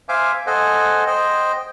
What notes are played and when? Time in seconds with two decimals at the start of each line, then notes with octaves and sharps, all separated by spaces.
0.09 C5 E5 F5 G#5 D6
0.47 A4 C5 D#5 F#5 G#5
1.07 C5 D#5 G5